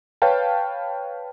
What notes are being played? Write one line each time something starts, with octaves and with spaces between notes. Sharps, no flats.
B4 C#5 F5 G5 A5